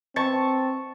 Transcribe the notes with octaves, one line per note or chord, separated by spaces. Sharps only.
C4 A5 C#6